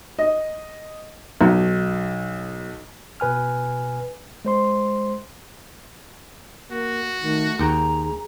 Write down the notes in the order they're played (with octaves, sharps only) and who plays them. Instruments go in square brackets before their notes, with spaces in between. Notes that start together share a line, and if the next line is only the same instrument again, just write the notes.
[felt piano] D#5
B1
[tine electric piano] B2 B4 G#5 F6
G#3 C5 C6
[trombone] A#3 [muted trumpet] F#4
[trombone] D#3 [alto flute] A3
[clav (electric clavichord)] D#2 G5 [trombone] G#4 [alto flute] A#5